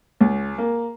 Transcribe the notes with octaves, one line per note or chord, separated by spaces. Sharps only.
C#2
A#3